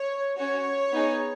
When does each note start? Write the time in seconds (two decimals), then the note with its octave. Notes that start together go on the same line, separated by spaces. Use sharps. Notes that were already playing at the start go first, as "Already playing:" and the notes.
Already playing: C#5
0.37 C#4 F#4 C#5
0.92 B3 D#4 G#4